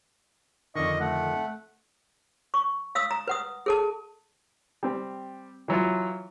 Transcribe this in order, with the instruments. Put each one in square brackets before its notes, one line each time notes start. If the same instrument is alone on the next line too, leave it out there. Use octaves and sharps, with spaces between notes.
[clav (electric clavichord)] F2 D3 D#3 [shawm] D#5 [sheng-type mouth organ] C#6
[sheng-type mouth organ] A3 [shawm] F#5
[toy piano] C#6
F5 D#6 E6
A#5
B4 F#5 D#6
G#4 A4 A5
[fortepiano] G3 C4
E3 F#3 E4 F4